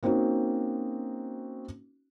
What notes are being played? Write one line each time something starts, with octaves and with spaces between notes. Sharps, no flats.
A#3 C4 C#4 D#4 F#4